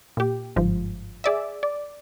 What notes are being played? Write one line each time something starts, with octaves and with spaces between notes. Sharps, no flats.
A#2 G4
G1 G#2 F3
G#4 D5 E5
D5